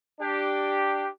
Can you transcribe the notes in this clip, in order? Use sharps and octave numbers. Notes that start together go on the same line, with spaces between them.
D4 G4